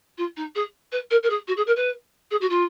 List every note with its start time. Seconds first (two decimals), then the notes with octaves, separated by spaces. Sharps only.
0.18 F4
0.37 D#4
0.55 G#4
0.92 B4
1.11 A#4
1.23 A#4
1.30 G#4
1.48 F#4
1.57 G#4
1.67 A#4
1.76 B4
2.31 G#4
2.41 F#4
2.50 F4